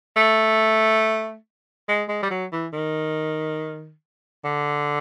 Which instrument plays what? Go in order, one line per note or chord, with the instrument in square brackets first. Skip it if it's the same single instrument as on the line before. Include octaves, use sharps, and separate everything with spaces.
[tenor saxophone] A3
G#3
G#3
G3
F#3
E3
D#3
D3